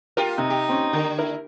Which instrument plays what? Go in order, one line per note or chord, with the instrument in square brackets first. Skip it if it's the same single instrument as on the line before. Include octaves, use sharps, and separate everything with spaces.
[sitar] F4 G4 [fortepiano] A#4
[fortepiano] C3 [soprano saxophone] D#4
[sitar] G4
[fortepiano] C4 C#4
[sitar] D3 [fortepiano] D#3
[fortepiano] E4 A#4